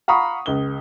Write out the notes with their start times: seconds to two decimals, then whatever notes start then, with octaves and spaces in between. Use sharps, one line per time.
0.08 F5 F#5 A#5 B5 C#6 D#6
0.46 C#2 G7